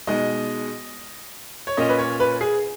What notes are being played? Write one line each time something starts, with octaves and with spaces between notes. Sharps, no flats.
B2 G#3 D#4 D#5
C#5
A#2 A#3 C#4 D#5
B4
C#5
B4
G#4